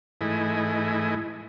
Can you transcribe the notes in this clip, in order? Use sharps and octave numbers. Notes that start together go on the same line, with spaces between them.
G#2 E3 A3 E4 D#5 G#5